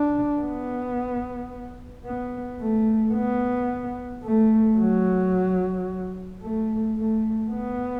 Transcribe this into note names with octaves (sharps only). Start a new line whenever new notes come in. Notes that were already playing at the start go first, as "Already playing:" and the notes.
Already playing: D4
B3
B3
A3
B3
A3
F#3
A3
A3
B3